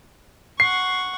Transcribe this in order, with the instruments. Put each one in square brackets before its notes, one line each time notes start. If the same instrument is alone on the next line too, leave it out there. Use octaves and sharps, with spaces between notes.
[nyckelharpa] F#5 C#6 [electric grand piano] C7